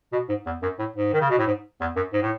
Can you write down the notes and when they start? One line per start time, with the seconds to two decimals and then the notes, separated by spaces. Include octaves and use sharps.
0.12 B2
0.29 G#2
0.46 E2
0.62 F#2
0.79 A2
0.96 G#2
1.13 D#3
1.20 C#3
1.30 B2
1.38 A2
1.47 G#2
1.80 E2
1.96 F#2
2.13 G#2
2.22 A2